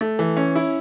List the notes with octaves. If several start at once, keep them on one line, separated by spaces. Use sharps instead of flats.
A3
E3
C#4
E4